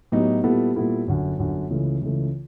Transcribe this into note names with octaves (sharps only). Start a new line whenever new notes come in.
A2 F#3 B3 D#4 G4
A#2 G3 B3 E4 A4
A#2 G3 B3 E4 A4
G1 F#2 D3
G1 F#2 D3
C#2 C#3 E3 A3
C#2 C#3 E3 A3